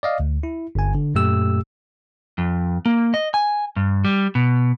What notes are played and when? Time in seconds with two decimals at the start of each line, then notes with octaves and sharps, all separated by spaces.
0.03 D5 D#5 F5
0.20 D2
0.43 E4
0.75 G1 G#5
0.95 D3
1.15 F#2 A#2 A3 G4 E6
2.38 F2
2.86 A#3
3.14 D#5
3.34 G#5
3.76 G2
4.05 G3
4.35 B2